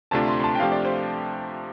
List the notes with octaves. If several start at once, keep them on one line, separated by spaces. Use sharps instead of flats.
D2 C3 A3 D4 F4 A5
C6
C6
A5
G5
C3 F3 A3 D4 G4 F5
D5
C5